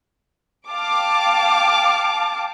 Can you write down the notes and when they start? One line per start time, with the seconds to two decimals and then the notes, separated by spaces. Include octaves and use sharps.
0.68 F5 G5 A5 D6